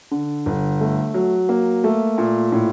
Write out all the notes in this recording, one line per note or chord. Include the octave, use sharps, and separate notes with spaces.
D3
G1
A3
F#3
A#3
A3
A#2
A2